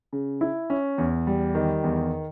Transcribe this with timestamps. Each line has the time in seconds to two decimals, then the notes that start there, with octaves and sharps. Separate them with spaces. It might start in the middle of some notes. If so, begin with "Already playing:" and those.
0.13 C#3
0.41 E4
0.70 C#4
0.98 E2
1.27 G3
1.55 D#3
1.84 E2